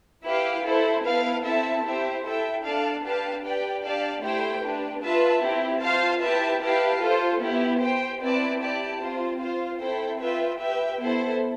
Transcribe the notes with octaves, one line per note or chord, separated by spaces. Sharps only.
E4 G4 B4 F5
E4 A4 C5
B3 E4 B4 F5 A5
C4 E4 A4 E5 A5
E4 G4 C5 E5
E4 A4 E5 G5
D4 A4 D5 F5 A5
D4 G4 B4 F5 A5
G4 B4 D5 G5
D4 G4 D5 F5 A5
A3 E4 G4 C5 G5
D4 G4 B4
F4 B4 E5 A5
C4 E4 G4
F4 C5 F5 A5
E4 G4 B4 E5 A5
E4 G4 B4 F5 A5
F4 A4 C5
B3 E4 G4
G4 C5 G5
C4 E4 B4 D5 A5
E4 G4 D5 A5
C4 F4 C5
F4 C5 F5
C4 E4 A4 C5 G5
F4 B4 E5 G5
G4 B4 E5 G5
B3 E4 A4 C5